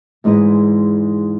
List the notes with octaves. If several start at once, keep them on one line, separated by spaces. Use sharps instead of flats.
E2 G#2 G#3 E4 D#5